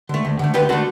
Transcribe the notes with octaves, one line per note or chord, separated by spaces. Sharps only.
D3 A3
D2
D3 A3
D2 G4 B4
D3 A3 F#4 A4